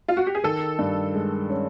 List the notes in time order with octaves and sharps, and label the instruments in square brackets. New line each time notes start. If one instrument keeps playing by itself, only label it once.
[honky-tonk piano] F4
F#4
G4
G#4
[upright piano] D#3 [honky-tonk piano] A4
[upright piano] G2
G#3
C#4